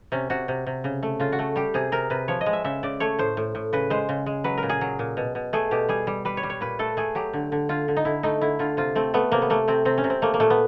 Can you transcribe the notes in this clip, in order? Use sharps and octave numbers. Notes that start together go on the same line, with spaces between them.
C3 C#4
C3 F#4
C3
C3
C#3
A3
C#3 F4
F#4
A3
G3 G4
C3 G#4
C3 A#4
C3 B4
F3 C#5
D#5
G#3
E5
C#3 E5
C#3 D5
A3 C#5
A2 C5
A2
A2
C#3 B4
G#3 C5
C#3
G#3
F#3 B4
A#4
A#2
G#4
F#3
A#2
B2
B2
A3 G#4
B2 G4
G3 G#4
G3
G3 B4
C#5
G3
C#5
A#2 B4
A3 A4
A3 G#4
F#3 G4
D3
D3
D3 F4
D3
D#4
D3 E4
A3 D#4
D3 E4
D3 F4
C3 F4
A3 C4
A3 B3
C3 A#3
B3
A3 A#3
C3 C4
C3 C4
C#4
C3
C4
A3 A#3
A#3
A#2 A3
B3